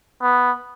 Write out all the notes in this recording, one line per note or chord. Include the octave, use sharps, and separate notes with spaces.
B3